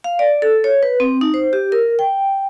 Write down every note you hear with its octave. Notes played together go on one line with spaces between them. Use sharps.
F5
D5
A4
C#5
B4
C4
D#4
C5
G4
A#4
G5